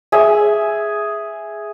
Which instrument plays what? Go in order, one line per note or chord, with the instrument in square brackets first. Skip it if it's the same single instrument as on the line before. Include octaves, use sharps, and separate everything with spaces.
[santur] G#4 E5